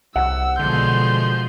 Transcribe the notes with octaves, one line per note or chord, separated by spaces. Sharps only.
C2 F#5 E6
B2 D3 F3 G#3 C6 G6